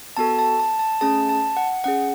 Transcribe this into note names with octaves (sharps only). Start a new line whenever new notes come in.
B3 F#4 A4 A5
A5
A5
A5
A3 C#4 G#4 A5
A5
F#5
C#4 G#4 F#5